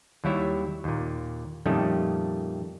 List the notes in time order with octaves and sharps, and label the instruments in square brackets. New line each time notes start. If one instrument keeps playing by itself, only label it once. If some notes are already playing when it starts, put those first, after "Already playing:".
[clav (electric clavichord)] D#2 F#3 G3 E4 C#5 E5
D#2 A#2
F2 A#2 D#3 G3 A3 C#4